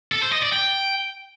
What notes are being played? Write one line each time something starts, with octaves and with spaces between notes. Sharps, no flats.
A4
C5
D#5
D5
G5